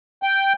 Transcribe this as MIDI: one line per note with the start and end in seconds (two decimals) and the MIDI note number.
0.23 0.53 79